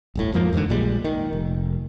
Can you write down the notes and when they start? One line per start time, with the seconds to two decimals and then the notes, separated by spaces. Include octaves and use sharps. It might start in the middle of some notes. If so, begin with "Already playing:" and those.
0.15 D1 G1 A2
0.33 F2 G#2 F3 A#3
0.53 E2 G#2 B2 D3
0.69 A#1 A#2 G3 G#3
1.04 D#3
1.33 F1